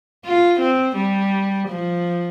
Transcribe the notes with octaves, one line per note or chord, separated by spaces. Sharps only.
F4
C4
G3
F3